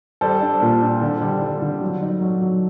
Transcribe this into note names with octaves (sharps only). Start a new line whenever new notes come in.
G3 A4 C5
D4
A#2
D4
D3
G3
D3
D3
F#3
D#4
F#3
F#3